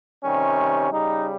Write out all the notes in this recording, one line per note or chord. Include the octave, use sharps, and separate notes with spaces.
C3 D#3 G3 C#4
C#3 G3 D#4